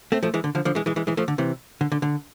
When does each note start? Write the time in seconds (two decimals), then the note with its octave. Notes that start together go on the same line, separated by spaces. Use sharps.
0.12 A3 C4
0.23 F3 A3
0.34 E3 G#3
0.44 D3
0.55 D3 F3
0.65 D3 F3
0.75 E3 G#3
0.86 E3 G#3
0.96 E3 G#3
1.07 E3 G#3
1.17 F3 A3
1.28 D3
1.38 C3 E3
1.81 D3
1.92 D3
2.02 D3